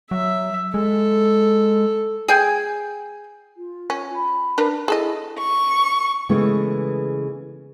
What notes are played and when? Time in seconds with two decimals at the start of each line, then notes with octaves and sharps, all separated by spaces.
0.11 F#3 E5
0.74 G#3 A4
2.28 G#4 G5 G#5
3.57 F4
3.90 C#4
4.14 B5
4.58 D4 A#4 B4
4.88 E4 G#4 A4 D#5
5.38 C#6
6.29 C#3 E3 G#3 A3 B3